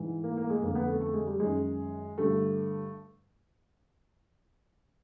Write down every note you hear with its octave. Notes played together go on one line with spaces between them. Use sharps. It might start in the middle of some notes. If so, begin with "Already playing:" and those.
Already playing: G#2 E3
A#3
A#3
G#3
F2 D3 A#3
B3
A3
A3
G#3
G3
F#2 D#3 G#3
G2 D3 A3